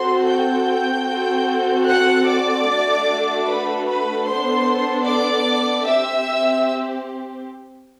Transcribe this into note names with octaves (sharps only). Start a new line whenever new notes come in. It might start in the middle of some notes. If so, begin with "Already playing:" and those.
Already playing: C4 F#4 A4 C5 C6
G5 G6
C4 F#4 A4
F#5 F#6
D5 D6
A3 D4 F#4
B4 B5
B4 B5
B3 D4 A4 C5 C6
D5 D6
C4 G4 E5 E6